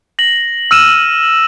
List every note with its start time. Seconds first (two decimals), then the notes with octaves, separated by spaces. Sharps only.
0.19 A#6 F#7
0.71 E6 F6 D#7 E7